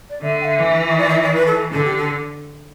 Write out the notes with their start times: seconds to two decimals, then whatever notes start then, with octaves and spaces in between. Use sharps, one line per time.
0.09 D5
0.22 D3 E5
0.41 G5
0.45 E5
0.59 E3
0.88 E5
0.98 D5
1.09 E5
1.23 D5
1.34 B4
1.47 A4
1.72 D3 A4
1.84 G4
1.97 A4